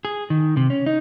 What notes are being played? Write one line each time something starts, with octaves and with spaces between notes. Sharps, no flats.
G#4
D#3
C3
C#4
D#4